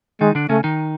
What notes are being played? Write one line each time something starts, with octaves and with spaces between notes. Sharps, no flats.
D#3 G#3 D#4
D3 D4
C#3 A3 C#4
D#3 D#4